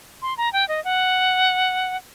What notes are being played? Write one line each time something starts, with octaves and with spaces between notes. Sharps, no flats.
C6
A#5
G5
D#5
F#5